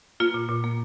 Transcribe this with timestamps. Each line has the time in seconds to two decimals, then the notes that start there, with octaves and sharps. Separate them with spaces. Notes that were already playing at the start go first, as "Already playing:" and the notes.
0.20 A#3 F4
0.34 A#2
0.49 A#2
0.64 A#3